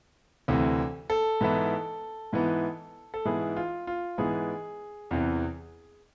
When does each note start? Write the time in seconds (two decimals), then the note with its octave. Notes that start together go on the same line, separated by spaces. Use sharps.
0.48 D2 C3 E3
1.10 A4
1.41 G#2 E3 B3 E4
2.33 G#2 E3 B3 E4
3.14 A4
3.25 G#2 E3 B3 E4 G#4
3.56 F4
3.87 F4
4.18 G#2 E3 B3 E4 G#4
5.11 E2 C3 E3